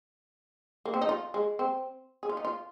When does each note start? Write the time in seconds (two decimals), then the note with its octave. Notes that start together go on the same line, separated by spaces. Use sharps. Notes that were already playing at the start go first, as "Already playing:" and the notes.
0.85 A#3
0.94 C4
1.01 D#4
1.09 F4
1.34 G#3
1.59 C4
2.23 G#4
2.29 F4
2.37 D#4
2.45 F4